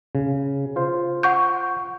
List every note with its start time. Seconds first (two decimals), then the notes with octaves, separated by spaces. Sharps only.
0.15 C#3
0.76 F4 C5
1.23 F#5 C#6 G6